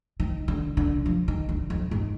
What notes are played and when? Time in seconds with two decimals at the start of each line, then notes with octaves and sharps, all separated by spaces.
0.20 D#3
0.48 D3
0.77 D3
1.06 F3
1.28 D#3
1.49 D3
1.70 F2
1.91 G#2